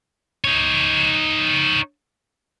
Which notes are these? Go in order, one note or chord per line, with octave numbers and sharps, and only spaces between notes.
D#4 C#5